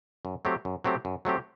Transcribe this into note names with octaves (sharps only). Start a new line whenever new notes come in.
F#2
F#3 A3 C4 G4
F#2
F#3 A3 C4 G4
F#2
F#3 A3 C4 G4